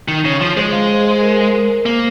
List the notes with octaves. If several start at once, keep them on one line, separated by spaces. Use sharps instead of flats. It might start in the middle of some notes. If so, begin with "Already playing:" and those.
D#3
C#3 C#5
F3
G#3 C5
F5
C5
C5
A#4
A#4
C5
A#3 A#4